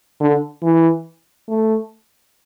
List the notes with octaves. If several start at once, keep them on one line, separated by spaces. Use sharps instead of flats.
D3
E3
A3